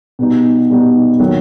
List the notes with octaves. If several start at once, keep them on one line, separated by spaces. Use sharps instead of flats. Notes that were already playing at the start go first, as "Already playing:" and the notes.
B2 G3 B3 D#4
B2 G3 B3 D#4
D#3 F#3 A#3